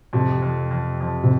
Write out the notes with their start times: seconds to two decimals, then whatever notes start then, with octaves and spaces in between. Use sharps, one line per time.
0.13 F2 C3
0.42 F2
0.71 F2
1.00 F2
1.23 C3